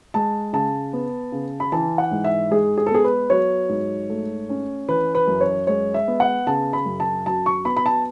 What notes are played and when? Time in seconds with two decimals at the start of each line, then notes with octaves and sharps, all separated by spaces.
0.14 G#3 A5
0.53 C#3 A5
0.93 B3
1.32 C#3
1.60 B5
1.72 E3 A5
1.98 F#5
2.11 G#2
2.24 E5
2.51 G#3 G#4
2.78 G#4
2.86 A4
2.91 B3 G#4
3.04 B4
3.30 F#3 C#5
3.69 G#2
4.10 A3
4.49 C#4
4.89 E3 B4
5.15 B4
5.27 F#2
5.41 C#5
5.67 G#3 C#5
5.94 E5
6.08 B3
6.20 F#5
6.47 C#3 A5
6.73 B5
6.86 F#2
7.00 A5
7.26 F#3 A5
7.46 C#6
7.65 B3 B5
7.77 B5
7.86 A5